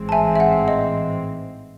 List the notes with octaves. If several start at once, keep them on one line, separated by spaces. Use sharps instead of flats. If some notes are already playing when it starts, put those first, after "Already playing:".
Already playing: A1 G#2 E3 G#3 C4
A5
E5 G#5
E5
F#5
D#5